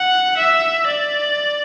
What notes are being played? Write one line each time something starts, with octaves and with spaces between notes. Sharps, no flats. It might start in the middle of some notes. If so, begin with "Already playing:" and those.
Already playing: F#5
E5
D5